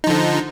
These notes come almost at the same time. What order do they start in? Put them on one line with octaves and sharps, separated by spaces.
D#4 F3 D3